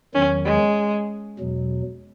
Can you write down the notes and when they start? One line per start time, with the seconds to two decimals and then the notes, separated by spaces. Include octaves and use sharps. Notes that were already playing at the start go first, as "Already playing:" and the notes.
0.15 E2 D#3 F#3 C#4
0.45 G#3
1.39 E2 B2 F#3